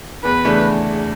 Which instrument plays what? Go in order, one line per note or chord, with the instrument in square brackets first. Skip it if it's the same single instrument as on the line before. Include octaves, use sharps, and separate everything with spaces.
[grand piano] E2 [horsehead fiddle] B4
[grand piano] C#3 E3 A3 D4